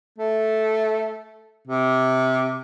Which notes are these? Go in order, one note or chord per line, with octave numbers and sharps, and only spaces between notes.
A3
C3